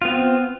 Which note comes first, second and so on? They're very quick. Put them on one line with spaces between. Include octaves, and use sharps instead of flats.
F4 B3 C4